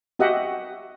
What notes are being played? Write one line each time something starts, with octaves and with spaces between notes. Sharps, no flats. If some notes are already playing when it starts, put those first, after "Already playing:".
F#4 G4 D#5 E5 F#5